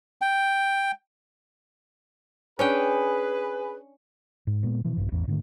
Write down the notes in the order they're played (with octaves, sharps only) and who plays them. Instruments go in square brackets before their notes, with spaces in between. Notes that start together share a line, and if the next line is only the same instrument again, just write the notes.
[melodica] G5
[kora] C#4 D4 G5 [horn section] G#4 B4
[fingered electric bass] G#2
A#2 G#3 B3
B2 E3 F3
A#1 G2
A1 E2
G#2 D3 D#3 A3